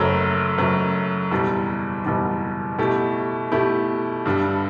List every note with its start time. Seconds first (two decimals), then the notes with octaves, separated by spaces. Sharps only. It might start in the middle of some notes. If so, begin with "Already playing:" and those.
Already playing: F#1 F#2 F#3 A3
0.58 F#1 F#2 F#3 A3
1.31 F#1 E2 B2 G3
2.05 F#1 E2 B2 G3
2.78 B2 A3 E4 G4
3.52 B2 A3 E4 G4
4.25 G2 D3 G3